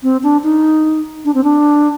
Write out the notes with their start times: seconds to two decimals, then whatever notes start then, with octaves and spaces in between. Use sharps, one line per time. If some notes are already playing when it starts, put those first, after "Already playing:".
0.03 C4
0.23 D4
0.44 D#4
1.25 D4
1.34 C4
1.44 D4